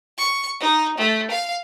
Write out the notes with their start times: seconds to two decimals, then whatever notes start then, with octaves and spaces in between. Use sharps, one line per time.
0.18 C#6
0.60 D#4
0.98 A3
1.31 F5